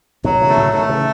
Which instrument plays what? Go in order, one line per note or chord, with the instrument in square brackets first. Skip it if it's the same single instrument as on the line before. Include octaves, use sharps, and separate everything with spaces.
[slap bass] B2 D#3 [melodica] F#3
[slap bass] C#3 E3
[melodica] A3
[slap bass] A2 C#3
[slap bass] B2 D#3 [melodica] A3
[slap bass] C#3 E3